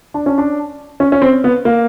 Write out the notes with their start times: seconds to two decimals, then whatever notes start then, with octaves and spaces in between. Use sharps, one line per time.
0.14 D4
0.26 C#4
0.38 D4
1.00 C#4
1.12 C#4
1.22 C4
1.44 B3
1.65 A#3